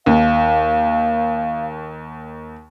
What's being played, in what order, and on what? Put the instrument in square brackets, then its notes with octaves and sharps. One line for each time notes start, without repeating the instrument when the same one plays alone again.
[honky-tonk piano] D#2 [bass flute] F5